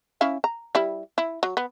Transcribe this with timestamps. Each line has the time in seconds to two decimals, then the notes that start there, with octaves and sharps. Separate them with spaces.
0.21 C#4 E4 F5
0.44 A#5
0.75 G3 E4
1.18 E4
1.43 F#3
1.57 B3